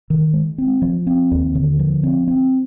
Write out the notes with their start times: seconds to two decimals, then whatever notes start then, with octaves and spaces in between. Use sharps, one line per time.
0.10 D#3
0.33 G#3
0.58 C4
0.82 F3
1.07 C4
1.31 D#2
1.55 D3
1.79 F3
2.03 C4
2.27 C4